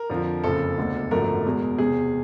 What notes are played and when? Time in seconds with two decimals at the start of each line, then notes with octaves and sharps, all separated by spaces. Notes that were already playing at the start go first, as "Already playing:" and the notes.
Already playing: A#4
0.10 F2 D3 F3
0.44 F#1 F2 C#3 A4
0.77 E1 D2 D3
1.11 G#1 F#2 D3 F3 A3 A#4
1.45 E2 B2 G#3
1.78 E1 E2 C3 G#4